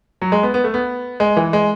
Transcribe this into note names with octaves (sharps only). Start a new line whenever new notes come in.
F#3
G#3
B3
B3
A3
B3
G#3
E3
G#3